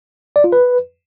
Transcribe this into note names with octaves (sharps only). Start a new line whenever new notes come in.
D5
F4
B4